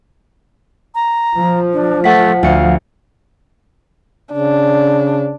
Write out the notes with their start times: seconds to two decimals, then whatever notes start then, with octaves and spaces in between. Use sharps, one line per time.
0.95 A#5
1.37 F3
1.73 D4
2.04 A3 F#5 B6
2.43 D2 F5 C#7
4.33 C#3 D4